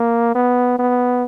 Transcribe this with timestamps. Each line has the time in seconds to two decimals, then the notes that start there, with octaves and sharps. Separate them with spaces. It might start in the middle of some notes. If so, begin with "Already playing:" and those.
Already playing: A#3
0.35 B3
0.79 B3